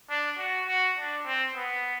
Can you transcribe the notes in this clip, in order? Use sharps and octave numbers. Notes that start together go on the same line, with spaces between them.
D4
F#4
F#4
D4
C4
B3